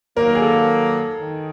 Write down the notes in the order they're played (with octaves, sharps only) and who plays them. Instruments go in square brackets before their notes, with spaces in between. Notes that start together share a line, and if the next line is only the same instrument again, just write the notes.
[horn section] D#3 F#3 A#3 [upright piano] A#4
[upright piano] G#4
A4
[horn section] D#3